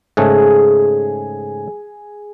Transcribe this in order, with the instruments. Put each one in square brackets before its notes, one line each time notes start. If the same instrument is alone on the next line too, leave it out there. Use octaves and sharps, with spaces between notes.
[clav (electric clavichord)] G#2 C#3 A3 [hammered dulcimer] G#4